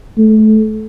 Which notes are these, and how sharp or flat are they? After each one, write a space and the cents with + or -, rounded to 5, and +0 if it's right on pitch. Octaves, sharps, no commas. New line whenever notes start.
A3 -25